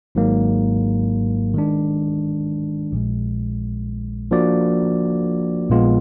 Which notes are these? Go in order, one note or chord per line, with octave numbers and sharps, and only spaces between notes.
G#1 G#2 F#3 A#3
D#3 G#3 D4
A#1 A#2 G#3
F3 A#3 D4 F#4 D5
A#1 A#2 G#3 B3 F4